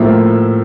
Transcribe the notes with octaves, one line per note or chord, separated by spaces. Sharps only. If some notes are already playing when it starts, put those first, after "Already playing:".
Already playing: A2 F3 A#3 E5